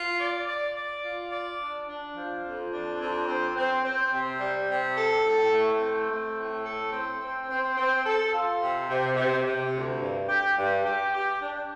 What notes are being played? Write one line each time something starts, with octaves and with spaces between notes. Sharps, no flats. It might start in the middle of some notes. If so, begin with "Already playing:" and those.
Already playing: F4
D5
D5
D5
F4
D5
D4
D4
F3
F2
D4
F2
C4
C4
C4
C3
G3
C3
A4
A2
A3
C4
A3
A2
A4
C4
C4
C4
C4
A4
F4
C3
C3
C3
C3
D2
G2
G4
G2
G4
G4
D4